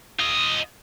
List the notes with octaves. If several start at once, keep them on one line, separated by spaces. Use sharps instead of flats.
F4 D#5